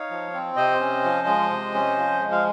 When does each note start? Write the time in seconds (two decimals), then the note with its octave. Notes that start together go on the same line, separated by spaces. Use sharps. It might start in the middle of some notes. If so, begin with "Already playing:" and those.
Already playing: D#4 C#5 F5
0.10 F3
0.34 C4
0.56 C3 C5 D#5
0.80 C#4
1.04 F3
1.27 G#3
1.50 C3
1.74 C#4
1.97 F3
2.20 G#3
2.32 F5